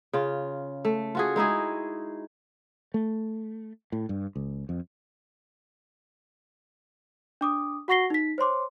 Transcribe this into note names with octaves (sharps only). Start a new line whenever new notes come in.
C#3 F4
A3
F4 F#4 G#4
G#3 D#4 E4 G#4
A3
A2
G2
C#2
F2
D4 D6 D#6
F#4 F#5 C#6 A#6 C7 G7
D#4 B6
C5 C#5 C6 D6